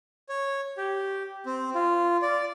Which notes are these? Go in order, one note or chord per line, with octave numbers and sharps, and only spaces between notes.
C#5
G4
C4
F4
D5